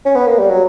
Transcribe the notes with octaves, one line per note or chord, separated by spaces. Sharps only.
C#4
B3
A#3
G3
F#3